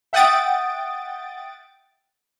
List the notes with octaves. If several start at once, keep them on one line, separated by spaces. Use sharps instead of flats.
E5 F#5 G5 D#6 A6 D7